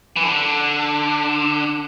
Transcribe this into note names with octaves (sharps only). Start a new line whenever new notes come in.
E3
D3